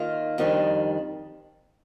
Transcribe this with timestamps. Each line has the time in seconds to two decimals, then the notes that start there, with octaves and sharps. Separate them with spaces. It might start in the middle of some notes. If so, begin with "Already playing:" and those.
Already playing: D#3 A#3 F4
0.38 F2 D#3 G3 D4